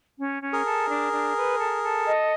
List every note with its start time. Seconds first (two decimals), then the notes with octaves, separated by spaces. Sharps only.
0.18 C#4
0.41 C#4
0.53 G#4 A#4
0.64 A4
0.89 D4
1.12 D4
1.36 B4
1.59 A4
1.82 A4
2.06 D#5